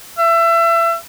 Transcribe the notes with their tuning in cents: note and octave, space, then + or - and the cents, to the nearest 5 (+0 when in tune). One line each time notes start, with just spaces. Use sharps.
E5 +30